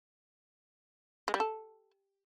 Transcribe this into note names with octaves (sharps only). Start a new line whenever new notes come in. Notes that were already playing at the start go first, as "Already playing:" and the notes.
G#3
G3
A4